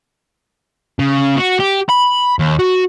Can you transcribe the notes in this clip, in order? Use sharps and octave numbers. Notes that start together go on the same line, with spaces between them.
C#3
F#4
G4
B5
D#2
F#4